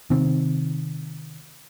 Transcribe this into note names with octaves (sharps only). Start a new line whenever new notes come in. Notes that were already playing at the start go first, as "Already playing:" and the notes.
C3 D#3 C4